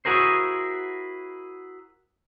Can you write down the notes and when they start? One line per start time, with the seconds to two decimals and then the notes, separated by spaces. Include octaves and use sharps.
0.05 E4 F#4 G#4 A#4 C5